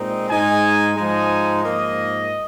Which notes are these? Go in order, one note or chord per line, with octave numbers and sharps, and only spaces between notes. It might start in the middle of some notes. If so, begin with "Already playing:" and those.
Already playing: A#2 G#3 C4 D#4
G#2 G#3 D#4 G#5
G#2 F3 G#3 D#4 G#5
G#2 F3 A#3 D#5